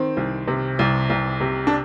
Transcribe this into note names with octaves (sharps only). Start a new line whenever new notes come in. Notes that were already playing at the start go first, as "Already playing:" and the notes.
Already playing: D#3 C4
C2
C3
C2
C2
C3
D4